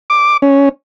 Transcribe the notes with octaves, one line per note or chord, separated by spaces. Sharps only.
D6
C#4